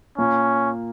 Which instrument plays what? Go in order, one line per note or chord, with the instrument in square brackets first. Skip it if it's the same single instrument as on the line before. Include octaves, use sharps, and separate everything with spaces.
[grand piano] A#2 A#3 [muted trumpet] C#4